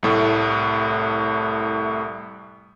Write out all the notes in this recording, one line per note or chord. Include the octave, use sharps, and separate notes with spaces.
C2 A2 A3